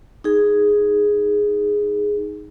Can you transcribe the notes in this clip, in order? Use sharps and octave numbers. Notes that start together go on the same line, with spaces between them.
D#4 G#4